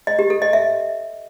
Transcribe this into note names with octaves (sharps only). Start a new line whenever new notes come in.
D#5
G4
A4
D#5
E5